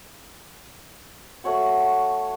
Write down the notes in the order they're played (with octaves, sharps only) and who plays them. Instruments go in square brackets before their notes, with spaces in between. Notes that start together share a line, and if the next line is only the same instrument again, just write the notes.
[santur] A3 F#4 C#5 F#5